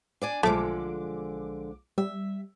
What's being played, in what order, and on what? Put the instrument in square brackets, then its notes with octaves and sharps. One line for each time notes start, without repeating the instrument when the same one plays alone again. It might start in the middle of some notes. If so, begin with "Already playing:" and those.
[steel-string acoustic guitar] D4 D5 G#5
[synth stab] B1 D6 [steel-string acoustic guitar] D3 F3 G#3 [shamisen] A3
[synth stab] G3 [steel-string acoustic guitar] E5